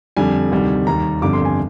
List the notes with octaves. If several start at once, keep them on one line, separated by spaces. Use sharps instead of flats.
F2 D3 G3 G#5
D2 C3 D#3 G3
D#2 D#3 G3 A#5
G1 F2 D3 G3 D6
C6
G#5